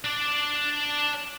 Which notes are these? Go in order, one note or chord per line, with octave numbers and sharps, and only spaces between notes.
D4 D5